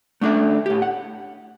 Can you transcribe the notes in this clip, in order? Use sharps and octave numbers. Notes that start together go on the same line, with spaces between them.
A3 C#4 D4 A4 E5
A2 G4
F#5